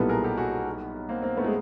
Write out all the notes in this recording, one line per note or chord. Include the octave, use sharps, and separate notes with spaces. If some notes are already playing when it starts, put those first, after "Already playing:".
Already playing: B1 A#2 G3 B3 E4 A4 B4
G#4 A#4
G4 A4
F#4 G#4
A#3 C4
A#3 C4
A3 B3
G#3